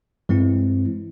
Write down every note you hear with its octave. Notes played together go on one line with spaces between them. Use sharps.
G2 E3 G#3 C4 E4